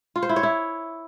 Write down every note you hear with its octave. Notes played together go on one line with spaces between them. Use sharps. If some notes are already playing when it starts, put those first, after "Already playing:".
F4
C5
E4
C#5
E4